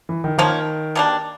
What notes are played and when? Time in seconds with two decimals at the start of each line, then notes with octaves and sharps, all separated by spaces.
0.09 E3
0.24 D#3
0.38 D#3 F3 A#3 C#4
0.95 B2 G3 A#3 D4